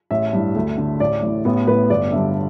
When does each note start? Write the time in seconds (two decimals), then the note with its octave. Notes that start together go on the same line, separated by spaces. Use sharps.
0.11 A1 E5
0.33 G2 E3
0.56 D2
0.78 D3
1.00 A1 D5
1.22 A2 E3
1.45 A1 B3
1.67 A2 E3 B4
1.90 G1 D5
2.12 G2 D3 E5